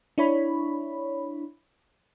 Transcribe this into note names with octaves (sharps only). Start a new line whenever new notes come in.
D4 E4 C#5 B5